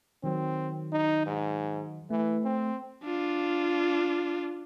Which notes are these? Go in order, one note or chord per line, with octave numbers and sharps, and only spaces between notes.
D#3 F#3 C4
D#4
G#2
E3 A3
C4
D4 F4